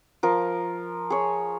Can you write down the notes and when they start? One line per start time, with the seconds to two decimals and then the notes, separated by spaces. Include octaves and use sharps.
0.23 F3 A#4
1.10 G#4 C#5